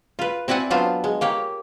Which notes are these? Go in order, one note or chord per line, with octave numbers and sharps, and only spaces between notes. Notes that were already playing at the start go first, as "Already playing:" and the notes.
F4 B4
C4 E4 D5 F#5 G#5
F#3 B3 D4 F4 C5
G#3
A#3 G4 C#5